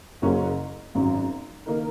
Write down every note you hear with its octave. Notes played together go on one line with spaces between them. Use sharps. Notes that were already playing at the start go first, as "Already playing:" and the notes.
F#1 F#2 F#3 A#3 C#4
G#1 F#2 F#3
D#3 A#3 D#4 A#4